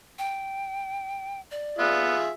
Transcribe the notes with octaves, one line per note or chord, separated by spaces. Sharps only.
G5
D5
B3 F4 G#4 E5